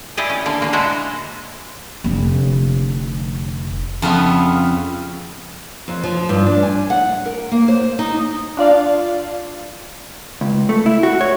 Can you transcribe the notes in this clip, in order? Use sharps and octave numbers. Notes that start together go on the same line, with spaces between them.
E4 G4 G#4 D5 D#5
C#4
D3 A#3 A#4
D3 A#3 C#4
G#3 D4 E4 F#4 D#5 A#5
F1 D3
F2 C#3 B3 F4 E5
F2
F3
G2
D4
G#5
F#5
A#4
A#3
C5
D#4
D4 F4 D5 F5
C#2
A3
E4
F#4
C#5